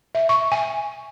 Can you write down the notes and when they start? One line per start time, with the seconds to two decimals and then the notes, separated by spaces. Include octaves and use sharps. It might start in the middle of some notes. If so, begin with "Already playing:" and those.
0.15 E5
0.29 C#6
0.52 G#5